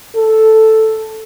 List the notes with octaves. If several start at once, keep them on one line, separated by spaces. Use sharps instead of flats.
A4